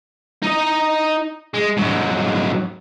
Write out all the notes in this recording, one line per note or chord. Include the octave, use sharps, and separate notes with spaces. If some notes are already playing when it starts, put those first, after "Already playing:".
D#4 D#5
G#3
G#2 F#3